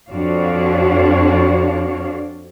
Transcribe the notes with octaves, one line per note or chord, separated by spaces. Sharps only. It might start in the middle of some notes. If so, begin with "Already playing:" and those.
F2 D4 F#4 C#5 D5 F5